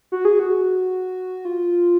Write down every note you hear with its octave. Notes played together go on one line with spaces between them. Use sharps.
F#4
G#4
F#4
F4